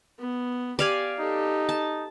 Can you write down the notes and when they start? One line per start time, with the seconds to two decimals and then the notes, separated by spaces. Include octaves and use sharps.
0.19 B3
0.79 G4 D5 F5 G#5
1.19 D#4 G4 A4
1.69 A5